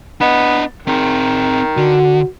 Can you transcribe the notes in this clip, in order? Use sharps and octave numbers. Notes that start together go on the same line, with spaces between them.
B3 D4 D#5
D#3 C4 G#4
D3 F#4